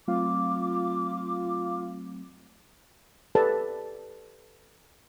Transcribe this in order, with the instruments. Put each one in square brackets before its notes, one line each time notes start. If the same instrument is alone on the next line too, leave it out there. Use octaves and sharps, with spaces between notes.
[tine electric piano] F#3 A3 C4 [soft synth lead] F4 [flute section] D6
[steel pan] G4 A4 B4 D5 A5